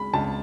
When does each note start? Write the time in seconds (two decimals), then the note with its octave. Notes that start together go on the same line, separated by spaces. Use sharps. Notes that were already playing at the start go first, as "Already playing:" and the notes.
Already playing: C#2 G#3 B5
0.13 C#2 A5